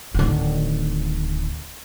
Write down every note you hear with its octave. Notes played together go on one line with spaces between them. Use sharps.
D1 D#3